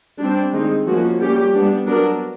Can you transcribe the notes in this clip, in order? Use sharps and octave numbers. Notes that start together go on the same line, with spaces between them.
G3 C4 D4
D#3 G#3 C4 D#4
F3 A#3 C#4 F#4
G3 A#3 C#4 G4
G3 B3 D4
F#3 B3 D4 A#4